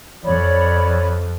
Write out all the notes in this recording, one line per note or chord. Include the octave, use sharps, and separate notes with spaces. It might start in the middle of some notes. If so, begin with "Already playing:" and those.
F2 C#5 D5 B5